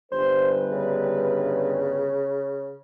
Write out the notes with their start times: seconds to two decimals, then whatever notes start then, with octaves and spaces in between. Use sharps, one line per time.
0.12 G1 G2 B4 C5
0.71 C#3